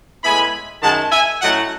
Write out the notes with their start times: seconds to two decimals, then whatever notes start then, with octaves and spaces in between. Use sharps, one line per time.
0.23 A2 G#3 B3 E4 G#5 B5
0.82 F#2 D#3 G#3 F#5 A5
1.12 E5 G#5
1.41 A2 F#3 A3 C#4 E4 D#5 F#5